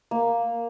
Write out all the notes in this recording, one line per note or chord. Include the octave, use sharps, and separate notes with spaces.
A#3